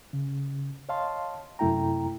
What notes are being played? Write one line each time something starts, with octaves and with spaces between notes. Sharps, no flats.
C#3
C#5 D#5 F5 A5 C6
F#2 C3 A3 E4 G5 A#5